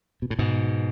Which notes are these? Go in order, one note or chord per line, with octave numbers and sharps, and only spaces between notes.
B2
A2
G#2 B2